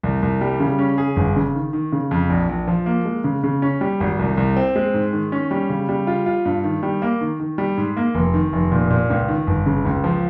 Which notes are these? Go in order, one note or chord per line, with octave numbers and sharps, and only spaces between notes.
C2
C2
G3
C#3
C#4
G#4
G1
C#3
D#3
D#3
C#3
F2
A#1
A#1
F3
A#3
G#3
C#3
C#3
C#4
G3
G#1
C2
C2
C4
G#3
G#2
D#3
C#4
G3
C#3
G3
F4
F4
G2
D#3
G3
A#3
D#3
D#3
G3
G#2
A#3
F1
D#3
F1
A#2
A#2
C#2
D#3
G1
C#3
C#2
F3